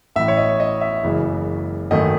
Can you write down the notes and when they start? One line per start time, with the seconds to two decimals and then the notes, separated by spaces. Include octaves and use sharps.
0.16 A1 A2 E3 E5
0.28 C#5
0.37 D#5
0.60 D#5
0.81 E5
1.03 F#1 F#2 C#3 E3 G#3
1.91 G#1 F#2 D#3 A3 D#5